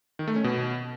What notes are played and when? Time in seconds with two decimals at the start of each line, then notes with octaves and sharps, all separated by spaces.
0.19 D#3
0.28 A3
0.36 C#4
0.44 B2